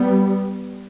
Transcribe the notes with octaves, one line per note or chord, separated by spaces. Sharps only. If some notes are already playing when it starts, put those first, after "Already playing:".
Already playing: G3 B3